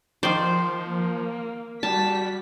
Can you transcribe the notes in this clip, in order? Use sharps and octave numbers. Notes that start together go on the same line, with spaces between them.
D#3 F3 C5 D5
A#3
G3 F#4 A5 B6